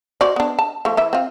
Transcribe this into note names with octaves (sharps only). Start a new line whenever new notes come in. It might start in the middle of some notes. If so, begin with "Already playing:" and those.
F#4 C5 D5
B3 D4
A5
F3 A3
E3 E4 E5
C4 F4